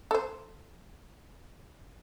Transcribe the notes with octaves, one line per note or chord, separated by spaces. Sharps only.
A4 C5